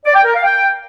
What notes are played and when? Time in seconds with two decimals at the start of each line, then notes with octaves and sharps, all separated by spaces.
0.05 D5
0.15 G5
0.25 A#4
0.34 F5
0.44 G5